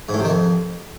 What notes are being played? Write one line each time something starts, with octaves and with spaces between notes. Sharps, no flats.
G#2
A2
C3
D#3
F2